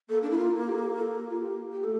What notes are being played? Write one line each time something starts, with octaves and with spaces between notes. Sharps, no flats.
A#3 A4
D4
E4
F4
G4
A4
G4
A4
F4
G4
G4
A3 A4